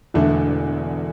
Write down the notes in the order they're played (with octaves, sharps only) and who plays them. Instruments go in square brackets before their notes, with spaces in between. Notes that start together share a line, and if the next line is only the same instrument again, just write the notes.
[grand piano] E1 E2 D3 A3 D4